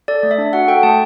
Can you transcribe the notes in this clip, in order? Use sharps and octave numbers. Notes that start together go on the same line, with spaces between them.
A4 D5
A3
E5
D4
F#4 F#5
A4 G5
A3 A5